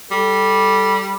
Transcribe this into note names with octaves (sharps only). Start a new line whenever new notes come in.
G3 A4